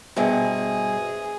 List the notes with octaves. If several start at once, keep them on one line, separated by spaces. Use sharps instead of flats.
G2 B2 G#4 C5 E5 G#5